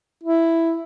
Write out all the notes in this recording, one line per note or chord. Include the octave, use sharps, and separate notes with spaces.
E4